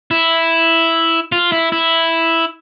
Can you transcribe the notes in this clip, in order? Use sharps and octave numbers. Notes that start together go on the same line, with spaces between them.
E4
F4
E4
E4